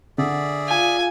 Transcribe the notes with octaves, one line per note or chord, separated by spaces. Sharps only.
D3 G#4 D5 E5
F4 F5 G#5